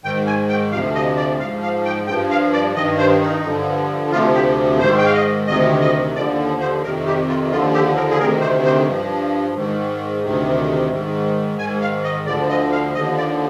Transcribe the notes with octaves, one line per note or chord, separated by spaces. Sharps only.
G#2 D#3 G5
G#5
G5
D2 C3 F3 F5
D#5
D5
G#2 F3 F5
F5
G5
G2 F3 G5
F5
D5
G2 D#3 D#5
C5
D#4
G2 D3 F3
D2 C3 F3 F4
G4
G#2 D#3 C5
G5
F5
D#5
D2 C3 D#3 D#5
D#5
D#2 D3 F3 D5
C5
F2 C3 D#3 A#4
G4
F4
D#2 D3 F3 F4
G4
A#4
G#4
D2 C3 D#3 A#4
C5
C5
G2 F3
G#2 D#3
D2 C3 D#3
G#2 D#3
G#2 D#3 G#5
F5
D#5
D2 D3 F3 D5
D#5
F5
D#2 D3 F3 D#5
D5